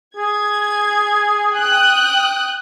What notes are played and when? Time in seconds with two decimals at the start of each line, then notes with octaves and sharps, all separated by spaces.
0.17 G#4 G#6
1.53 G5 D#6 F#6